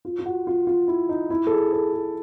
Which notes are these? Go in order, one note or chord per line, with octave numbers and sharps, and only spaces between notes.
F4
F4
F#4
F4
F4
E4
D#4
E4
A4
G#4
A4
G#4